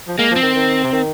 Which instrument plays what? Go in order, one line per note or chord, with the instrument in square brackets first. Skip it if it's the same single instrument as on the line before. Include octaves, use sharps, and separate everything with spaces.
[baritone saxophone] F3
[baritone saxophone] G#3 [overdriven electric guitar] A#3
[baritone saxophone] F3
[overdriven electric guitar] C4
[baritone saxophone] D#3
D#3
C3
D#3